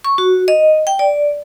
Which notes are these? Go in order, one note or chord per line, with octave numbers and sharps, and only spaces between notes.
C#6
F#4
D#5
G5
D5